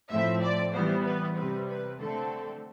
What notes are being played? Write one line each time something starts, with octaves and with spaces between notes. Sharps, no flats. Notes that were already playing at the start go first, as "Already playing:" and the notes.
A2 F3 C4 E5
D5
E3 G3 B3 C5
B4
C3 G3 C4 B4
B4
D3 A3 C4 A4